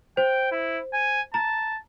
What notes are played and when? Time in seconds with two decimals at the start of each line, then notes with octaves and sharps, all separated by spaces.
0.17 C5 G5
0.51 E4
0.93 G#5
1.34 A5 A#5